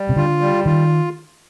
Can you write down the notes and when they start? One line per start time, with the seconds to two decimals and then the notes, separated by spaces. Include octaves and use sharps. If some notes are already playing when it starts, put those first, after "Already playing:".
Already playing: G3
0.09 C3
0.16 D3 F4
0.41 G3
0.66 D#3 F4